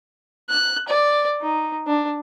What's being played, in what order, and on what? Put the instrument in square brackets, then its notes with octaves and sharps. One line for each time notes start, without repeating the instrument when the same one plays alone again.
[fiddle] F#6
D5
D#4
D4